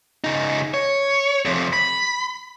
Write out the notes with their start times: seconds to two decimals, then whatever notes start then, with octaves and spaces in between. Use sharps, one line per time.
0.24 C#3 D#4
0.74 C#5
1.45 F2 C3
1.73 B5